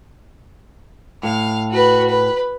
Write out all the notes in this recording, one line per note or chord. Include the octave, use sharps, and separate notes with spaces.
A2 F5
F#4 B4
B4